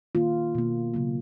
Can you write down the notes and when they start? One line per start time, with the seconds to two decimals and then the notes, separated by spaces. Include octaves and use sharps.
0.15 D#3 A#3 F4
0.55 B2 A#3
0.94 C#3 F#3 A#3